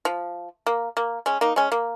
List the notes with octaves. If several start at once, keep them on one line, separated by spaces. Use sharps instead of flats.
F3
A#3
A#3
G#3 C#4
A#3 D#4
G#3 C#4
A#3